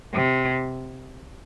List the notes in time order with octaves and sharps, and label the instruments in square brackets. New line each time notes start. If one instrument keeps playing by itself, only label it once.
[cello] C3